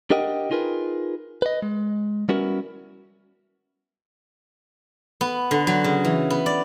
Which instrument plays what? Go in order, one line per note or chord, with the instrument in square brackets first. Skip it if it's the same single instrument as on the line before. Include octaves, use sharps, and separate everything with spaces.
[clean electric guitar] D4 G4 A#4 D#5 F#5 G5
D#4 F4 G#4 A#4 B4
B4 D#5
G#3
G3 B3 C#4 E4 F#4 A#4
[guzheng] B3
D3
F#3
C#3
E3
B3
D5